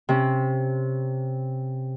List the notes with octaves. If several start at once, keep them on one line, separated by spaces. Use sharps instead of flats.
C3 C#4